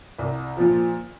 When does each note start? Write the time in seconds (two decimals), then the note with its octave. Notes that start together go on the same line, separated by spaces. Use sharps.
0.19 C2
0.57 A#2 F3